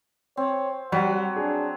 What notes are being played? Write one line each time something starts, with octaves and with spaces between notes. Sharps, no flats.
C4 C#5
F#3 G3 F#5
D4 G#4